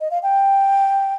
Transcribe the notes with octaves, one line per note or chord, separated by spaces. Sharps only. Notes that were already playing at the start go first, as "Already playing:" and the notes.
D#5
F5
G5